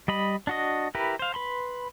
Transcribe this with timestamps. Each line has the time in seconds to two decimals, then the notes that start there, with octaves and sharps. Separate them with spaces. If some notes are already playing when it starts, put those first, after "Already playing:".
0.08 G3 D#5 B5
0.47 D4 F#4 D#5
0.95 E4 G4 A#4 B4
1.19 C5 F5
1.34 B4 B5 C6